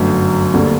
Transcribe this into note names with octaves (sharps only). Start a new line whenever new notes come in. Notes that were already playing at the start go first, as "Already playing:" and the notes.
Already playing: G1 F#2 F#3 A3
D2 D3 G3 A#3